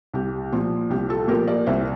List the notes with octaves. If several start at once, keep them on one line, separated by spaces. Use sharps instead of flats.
C2 G4
A#2 F3 F4
C2 G4
F4 A4
A#2 F3 G4 A#4
A#4 D5
C2 C5 E5